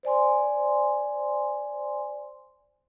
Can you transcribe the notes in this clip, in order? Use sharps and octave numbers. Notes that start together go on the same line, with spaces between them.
C5 D5 G#5 C6